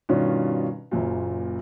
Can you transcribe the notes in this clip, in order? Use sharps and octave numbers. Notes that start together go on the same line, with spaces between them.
G2 B2 D#3 C#4 D4 F4
F#1 F#2 A#2